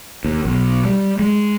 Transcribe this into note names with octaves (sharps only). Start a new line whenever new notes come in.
D#2
B1
G3
G#3